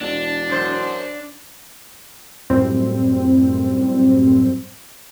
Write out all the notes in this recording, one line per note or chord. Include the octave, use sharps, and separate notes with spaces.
E1 D4
F#2 C5
F#2 A2 G3 C4